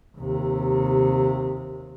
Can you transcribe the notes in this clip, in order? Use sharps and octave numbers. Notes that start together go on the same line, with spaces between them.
D#2 C3